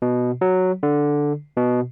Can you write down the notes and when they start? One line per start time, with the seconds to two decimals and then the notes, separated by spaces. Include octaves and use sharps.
0.02 B2
0.41 F#3
0.83 D3
1.56 B2